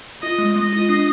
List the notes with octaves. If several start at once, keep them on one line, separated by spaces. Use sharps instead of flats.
F4 D#5
G#3
G#3 D#5
F4
D4